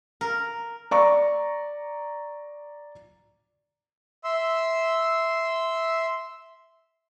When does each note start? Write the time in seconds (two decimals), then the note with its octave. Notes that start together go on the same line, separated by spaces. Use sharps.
0.21 A#4
0.91 D5 A#5 C#6
4.24 E5 C6 E6